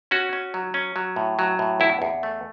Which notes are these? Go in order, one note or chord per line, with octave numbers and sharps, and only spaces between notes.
C#4 F#4
C#4
F#3
C#4
F#3
A2
F#3
A2
E2 E4
E2
A3